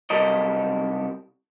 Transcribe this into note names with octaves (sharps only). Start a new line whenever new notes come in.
B1 C3 G3 A4 A#4 D#5